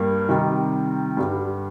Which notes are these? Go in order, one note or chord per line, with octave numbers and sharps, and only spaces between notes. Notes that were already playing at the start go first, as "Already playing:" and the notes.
Already playing: G2 G3 A#3
C3 D#3 G3 C4 D#4
G2 D3 G3